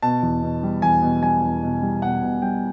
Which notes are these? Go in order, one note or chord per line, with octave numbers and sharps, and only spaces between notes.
B2 A5
E2
B2
G3
E2 G#5
B2
G3 G#5
E2
B2
G3
B2 F#5
B2
G3 G5